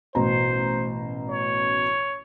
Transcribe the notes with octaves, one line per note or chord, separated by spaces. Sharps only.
A1 B2 C5 A#5
C#5